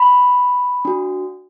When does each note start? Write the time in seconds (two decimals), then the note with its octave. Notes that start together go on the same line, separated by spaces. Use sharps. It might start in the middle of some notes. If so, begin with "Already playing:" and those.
Already playing: B5
0.85 D4 F#4